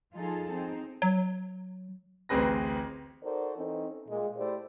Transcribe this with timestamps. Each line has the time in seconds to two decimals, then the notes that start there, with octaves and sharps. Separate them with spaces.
0.14 F3 D#4 F4 G#4 A4
0.52 C4 D#4
1.02 F#3
2.29 A1 D2 C4 G#4 B4 A#6
3.24 D#4 F#4 A4 A#4 C5 D5
3.56 E3 C4 C#4 D#4 A4
4.09 A#2 G#3
4.38 A3 E4 G4 C5 D5